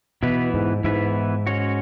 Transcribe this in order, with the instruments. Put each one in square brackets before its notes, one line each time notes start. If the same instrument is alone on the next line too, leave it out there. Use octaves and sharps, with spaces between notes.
[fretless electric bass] B2 [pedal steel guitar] E3 B3 E4 B4
[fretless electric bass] G#2
[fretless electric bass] G#2 [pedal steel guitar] E3 B3 E4 B4
[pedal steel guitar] G#3 C#4 F#4 C#5